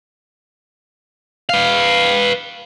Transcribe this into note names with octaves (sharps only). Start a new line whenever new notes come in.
B4 F5